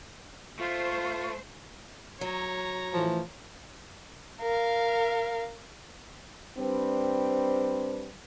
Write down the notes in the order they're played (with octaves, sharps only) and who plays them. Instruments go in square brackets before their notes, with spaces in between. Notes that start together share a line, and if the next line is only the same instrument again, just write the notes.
[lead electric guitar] A3 [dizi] F4 [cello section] C5
[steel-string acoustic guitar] F#3 [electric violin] C#5 A#5
[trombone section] A2 E3 [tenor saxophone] F3
[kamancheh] A#4 F5
[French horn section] G3 C4 D4 B4 C5